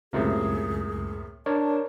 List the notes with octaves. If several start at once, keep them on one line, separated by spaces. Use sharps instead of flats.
C#2 F#2 A2 C3 A#3 G#4
D4 A#4 C#5 D5 A5